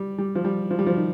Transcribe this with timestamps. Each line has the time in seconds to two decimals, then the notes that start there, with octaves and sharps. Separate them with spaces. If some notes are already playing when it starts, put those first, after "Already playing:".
Already playing: G3
0.18 G3
0.35 F3
0.44 G3
0.71 F3
0.79 G3
0.87 F3
0.97 D#3